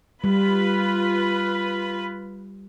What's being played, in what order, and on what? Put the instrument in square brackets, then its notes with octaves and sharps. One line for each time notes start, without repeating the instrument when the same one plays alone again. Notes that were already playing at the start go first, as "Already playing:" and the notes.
[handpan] G3 [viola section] F4 B4 B5